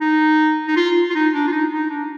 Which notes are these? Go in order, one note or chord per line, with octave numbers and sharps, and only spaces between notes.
D#4
D#4
F4
F4
D#4
D4
F4
D#4
D#4
D4